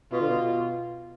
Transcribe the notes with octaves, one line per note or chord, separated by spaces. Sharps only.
B2 F4
D3
B2